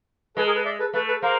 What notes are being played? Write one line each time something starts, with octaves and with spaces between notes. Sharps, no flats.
G#3 A4 B4
G#4 A#4
A4 B4
D5 E5
A4 B4
A3 A4 B4
A4 B4
A#3 A#4 C5